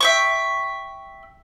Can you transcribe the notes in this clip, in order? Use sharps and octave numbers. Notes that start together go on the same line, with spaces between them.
E5 G5 C#6